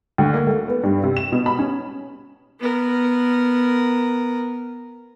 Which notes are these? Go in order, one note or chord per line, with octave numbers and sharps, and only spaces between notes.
D2
A#3
A3
B3
G2
C3
E7
B2
B5
C#4
B3 A#4